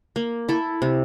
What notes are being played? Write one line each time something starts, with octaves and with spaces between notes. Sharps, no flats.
A#3
E4 A4
C3